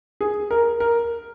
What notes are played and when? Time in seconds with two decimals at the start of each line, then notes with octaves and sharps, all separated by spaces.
0.21 G#4
0.51 A#4
0.80 A#4